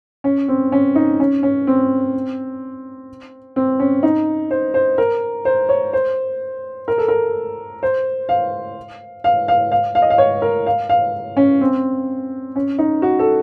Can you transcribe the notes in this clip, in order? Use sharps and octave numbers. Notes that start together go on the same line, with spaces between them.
C#4
C4
C#4
D#4
C#4
C#4
C4
C4
C#4
D#4
C5
C5
A#4
C5
C#5
C5
A#4
A4
A#4
C5
F5
F5
F5
F5
F5
D#5
F5
C#5
A#4
F5
F5
C#4
C4
C#4
D#4
F#4
A4